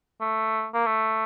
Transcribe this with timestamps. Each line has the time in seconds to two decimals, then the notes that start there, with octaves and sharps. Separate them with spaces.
0.21 A3
0.74 A#3
0.86 A3